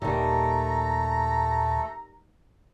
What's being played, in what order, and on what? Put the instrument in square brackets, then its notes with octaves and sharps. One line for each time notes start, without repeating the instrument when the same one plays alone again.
[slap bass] D#1 D#2 [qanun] D#3 G3 [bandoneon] A3 A4 [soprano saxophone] A#5